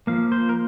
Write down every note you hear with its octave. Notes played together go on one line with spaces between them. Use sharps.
F3 A#3 F5
C5
A#4